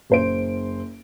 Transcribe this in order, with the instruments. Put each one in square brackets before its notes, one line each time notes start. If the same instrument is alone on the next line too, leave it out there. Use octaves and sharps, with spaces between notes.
[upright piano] F#1 C5 D7